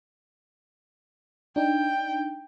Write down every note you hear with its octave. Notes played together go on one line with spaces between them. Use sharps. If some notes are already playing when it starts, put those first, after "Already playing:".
D4 D#4 G5